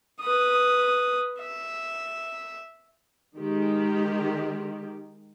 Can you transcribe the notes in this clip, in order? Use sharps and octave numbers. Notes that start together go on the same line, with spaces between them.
B4 D#6
E5
D#3 G#3 G4